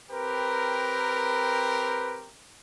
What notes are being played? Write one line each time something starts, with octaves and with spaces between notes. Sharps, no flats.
C4 G4 A#4 B4